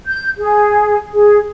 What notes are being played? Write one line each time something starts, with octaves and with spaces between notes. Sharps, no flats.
G6
G#4
G#4